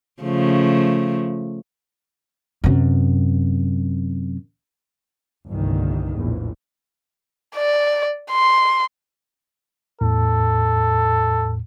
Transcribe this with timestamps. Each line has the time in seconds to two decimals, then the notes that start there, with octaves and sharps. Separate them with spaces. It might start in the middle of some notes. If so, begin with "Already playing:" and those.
0.22 C#3 F3 A3
2.64 F#2 C3
5.49 G1 C2 A2 D#3
6.13 A#1 E2 A2
7.56 D5
8.32 C6
10.01 E2 A2 A4